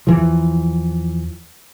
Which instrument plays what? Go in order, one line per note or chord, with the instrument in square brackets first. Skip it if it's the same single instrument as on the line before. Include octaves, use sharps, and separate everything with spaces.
[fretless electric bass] E2 E3 F3